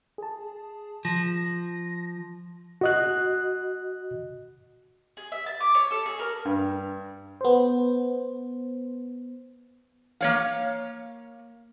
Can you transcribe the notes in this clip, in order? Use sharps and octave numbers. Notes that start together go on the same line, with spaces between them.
G#4 A5
F3 A#6
F#4 D#5 F#6
G#4
E5
A5
D6
C#5
A4
G#4
A#4
G2
B3 C5
A#3 C#5 F5